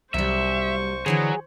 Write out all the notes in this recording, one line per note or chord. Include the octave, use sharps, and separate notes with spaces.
C2 F#3 G3 C5 E5 C#6
D3 E3 F#3 D4 G#4